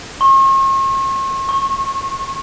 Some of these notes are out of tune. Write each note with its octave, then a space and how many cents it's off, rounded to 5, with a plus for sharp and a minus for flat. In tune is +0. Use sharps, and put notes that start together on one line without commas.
C#6 -45
C#6 -25